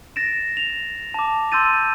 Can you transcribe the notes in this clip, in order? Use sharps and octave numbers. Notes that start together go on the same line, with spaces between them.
A6 A#6 D7 E7
F7
A5 D6
C6 E6 G6 A6 D#7